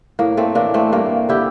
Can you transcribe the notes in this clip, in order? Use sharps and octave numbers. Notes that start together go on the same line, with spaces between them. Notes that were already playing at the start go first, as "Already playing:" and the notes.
A2 A#3
A3 C4
E3 A#3 D4
A3 C4
G2 A#3
D3 E4 G4